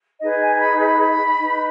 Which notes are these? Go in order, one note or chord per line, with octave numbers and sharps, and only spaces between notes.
D#4 G#4 B4 D#5
G#5
G#5
B5
B5
D#4 B4